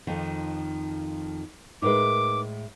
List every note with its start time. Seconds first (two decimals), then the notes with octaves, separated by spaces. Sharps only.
0.07 F2 D#3 F3
1.82 A2 G#3 D#4 A#4 B4 D6